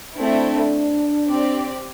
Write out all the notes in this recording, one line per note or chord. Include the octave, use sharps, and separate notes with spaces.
A3 C4 D4 E4
C4 G4 D5